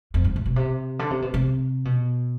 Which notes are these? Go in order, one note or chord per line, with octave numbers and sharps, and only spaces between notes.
F2
G#2
A2
B2
C3
D3
C3
B2
C3
B2